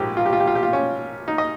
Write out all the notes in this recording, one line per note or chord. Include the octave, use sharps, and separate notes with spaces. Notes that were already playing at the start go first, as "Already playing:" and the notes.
Already playing: A#1 G#2 F3 G#3 G4
F4
G4
F4
G4
F4
G4
F4
C#4
D#4
D#5